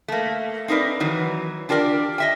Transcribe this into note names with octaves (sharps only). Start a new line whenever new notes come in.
A3 A#3
C4 D#4 A#4 B4 D5
D#3 E3 F#3
D4 F4 G4 A#4 D5
D#5 E5 G5